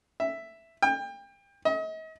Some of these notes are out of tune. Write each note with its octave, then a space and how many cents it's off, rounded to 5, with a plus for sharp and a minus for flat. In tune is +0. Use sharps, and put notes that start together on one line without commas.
E5 +5
G5 +30
D#5 +40